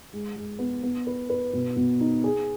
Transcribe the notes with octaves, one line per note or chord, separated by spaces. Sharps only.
G#3
G#3
B3
B3
B4
B4
B2
B2
D#4
G#4